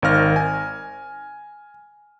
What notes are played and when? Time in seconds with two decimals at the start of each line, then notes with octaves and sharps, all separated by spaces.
0.02 G#1 D#3 F5 F6 A#6
0.36 G#5